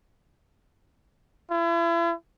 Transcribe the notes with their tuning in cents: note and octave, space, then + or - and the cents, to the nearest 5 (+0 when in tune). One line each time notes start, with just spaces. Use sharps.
E4 +40